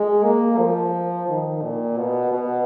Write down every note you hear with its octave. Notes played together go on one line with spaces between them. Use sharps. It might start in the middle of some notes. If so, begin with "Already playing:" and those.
Already playing: G#3
A#3
F3
D#3
A#2
B2
B2